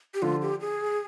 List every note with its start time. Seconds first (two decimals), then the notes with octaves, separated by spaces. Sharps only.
0.14 G4
0.22 D3 F3 F4
0.42 G4
0.61 G#4